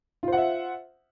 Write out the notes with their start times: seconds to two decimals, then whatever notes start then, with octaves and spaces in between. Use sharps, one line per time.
0.23 F4
0.28 C5
0.32 F#5
0.37 E5